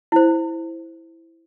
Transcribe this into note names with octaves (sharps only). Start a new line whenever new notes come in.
E4 C5